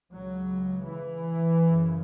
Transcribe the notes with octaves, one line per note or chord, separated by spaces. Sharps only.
C#2 C#3 F#3
E3
F#2 C#3